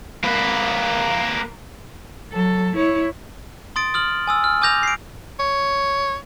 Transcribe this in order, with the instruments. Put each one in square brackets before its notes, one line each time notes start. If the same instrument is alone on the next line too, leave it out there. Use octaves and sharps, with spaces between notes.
[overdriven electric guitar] A#3 B4
[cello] F#3 A4
E4 C#5
[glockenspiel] C6 D#6 A6 D7
D#6 F6 F#7
G#5 D#6 E6
F6
G#5 D6 D#6 G6 A#6 F7
C7 D7
[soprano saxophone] C#5